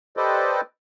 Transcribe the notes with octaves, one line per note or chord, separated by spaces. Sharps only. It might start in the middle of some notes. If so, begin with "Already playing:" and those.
G4 A4 B4 C5 D5 D#5